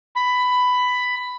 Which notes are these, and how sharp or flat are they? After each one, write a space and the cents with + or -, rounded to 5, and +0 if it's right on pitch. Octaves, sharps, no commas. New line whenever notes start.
B5 +10